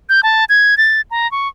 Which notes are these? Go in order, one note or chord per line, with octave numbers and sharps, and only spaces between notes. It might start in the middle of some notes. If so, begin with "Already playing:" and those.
G6
A5
G#6
A6
A#5
C#6